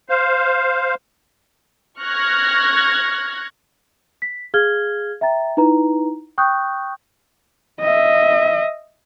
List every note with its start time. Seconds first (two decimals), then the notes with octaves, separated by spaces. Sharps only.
0.09 C5 F5
1.99 C#6 F6 F#6 G#6 A#6
4.22 B6
4.54 G#4 F5 F6 G#6 G7
5.21 E5 G5 A#5 A6
5.57 D#4 E4 B4 A#5
6.38 G5 C#6 D#6 F#6 G6
7.81 D#5 E5